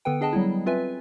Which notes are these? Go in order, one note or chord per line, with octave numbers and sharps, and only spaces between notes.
D3 B3 A4 B4 G5
D4 G#4 D#5 G5 A5
F#3 G3 B3 E4
C4 F4 B4 E5 G#5